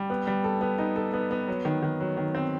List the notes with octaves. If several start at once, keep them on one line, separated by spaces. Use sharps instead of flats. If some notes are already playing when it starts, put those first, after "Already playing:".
Already playing: G3
B3
G3
A4
B3
D#4
A4
B3
B3
F#3
D#3
D#3
F#3
D#3
C4